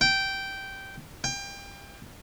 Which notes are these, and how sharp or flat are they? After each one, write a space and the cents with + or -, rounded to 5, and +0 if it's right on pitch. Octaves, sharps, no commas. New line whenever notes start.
G5 -10
G5 +25